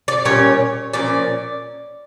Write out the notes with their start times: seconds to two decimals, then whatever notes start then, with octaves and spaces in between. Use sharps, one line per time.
0.08 D5
0.25 A#2 G3 C#4 C#5
0.93 A#2 F3 C#4 D5